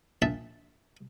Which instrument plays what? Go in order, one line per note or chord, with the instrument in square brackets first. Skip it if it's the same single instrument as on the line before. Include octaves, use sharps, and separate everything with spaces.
[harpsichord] A#1 E5 A5